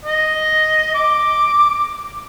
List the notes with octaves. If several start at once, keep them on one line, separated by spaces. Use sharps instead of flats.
D#5
D6